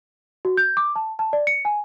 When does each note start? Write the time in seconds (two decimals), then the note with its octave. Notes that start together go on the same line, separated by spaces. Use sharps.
0.45 F#4
0.57 G6
0.77 D6
0.96 A5
1.19 A5
1.33 D5
1.47 C#7
1.65 G#5